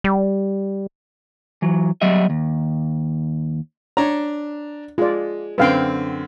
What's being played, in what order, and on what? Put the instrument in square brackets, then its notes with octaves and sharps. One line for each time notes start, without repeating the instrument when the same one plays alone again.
[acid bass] G3
[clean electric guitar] E3 F#3
F#3 G3 D#5 E5
D#2
[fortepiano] D4 A#5 [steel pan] C#5
[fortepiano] G#3 [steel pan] F4 D5
[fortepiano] F#2 D3 C4 [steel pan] B4 F5 G5